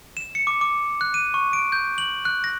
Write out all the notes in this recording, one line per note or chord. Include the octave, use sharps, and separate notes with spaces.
E7
C#7
D6
D6
F#6
D#7
C#6
D7
G6
F#7
F#6
A#6